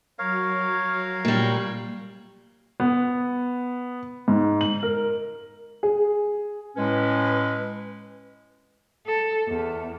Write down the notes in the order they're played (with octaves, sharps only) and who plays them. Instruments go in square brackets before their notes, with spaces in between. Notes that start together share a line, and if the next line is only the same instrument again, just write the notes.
[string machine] F#3 [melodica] A#4 C#5 F5
[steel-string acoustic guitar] A#2 G3
[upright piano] B3
G#2
F#7
A#4
[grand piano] G#4
[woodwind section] A2 G#3 C#4 B4
[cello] A4
E2